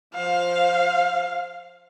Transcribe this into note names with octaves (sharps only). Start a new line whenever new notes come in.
F3 C5 F5